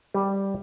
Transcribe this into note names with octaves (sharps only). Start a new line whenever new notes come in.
G3